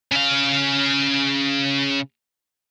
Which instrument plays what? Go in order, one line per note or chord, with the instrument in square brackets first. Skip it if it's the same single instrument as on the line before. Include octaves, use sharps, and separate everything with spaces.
[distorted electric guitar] C#3 F5